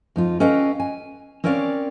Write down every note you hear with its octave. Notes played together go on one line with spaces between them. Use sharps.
F2 D#4 F4
C#4 A4 B4 D#5 F5 G5
G#5
C4 C#4 A#4 C#5 D5 F5